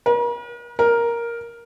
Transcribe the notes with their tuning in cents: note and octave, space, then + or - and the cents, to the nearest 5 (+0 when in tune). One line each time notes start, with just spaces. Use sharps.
A#4 +45
A#4 +5